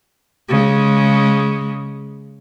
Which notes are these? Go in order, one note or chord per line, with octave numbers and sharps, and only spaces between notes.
C#3 G#3